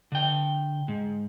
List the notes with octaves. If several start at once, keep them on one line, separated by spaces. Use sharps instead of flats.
D3 G5
G#2